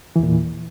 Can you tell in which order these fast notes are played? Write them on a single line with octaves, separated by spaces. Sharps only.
E3 E2 A#2